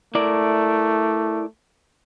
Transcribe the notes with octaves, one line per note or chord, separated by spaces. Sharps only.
A3 E4 A#4 D5